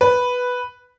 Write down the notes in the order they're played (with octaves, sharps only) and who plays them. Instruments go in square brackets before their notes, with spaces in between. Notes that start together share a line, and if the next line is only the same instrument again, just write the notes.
[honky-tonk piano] B4